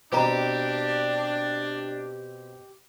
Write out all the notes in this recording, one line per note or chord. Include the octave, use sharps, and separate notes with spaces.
B2 C4 D4 G4 B4 A#5